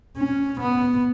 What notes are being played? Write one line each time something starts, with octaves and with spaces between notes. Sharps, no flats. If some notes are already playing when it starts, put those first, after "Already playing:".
C#4
B3